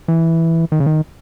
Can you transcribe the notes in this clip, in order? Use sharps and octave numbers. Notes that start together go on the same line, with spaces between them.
E3
D#3
C#3
D#3